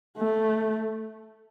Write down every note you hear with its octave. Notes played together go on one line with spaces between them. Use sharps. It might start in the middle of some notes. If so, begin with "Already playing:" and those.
A3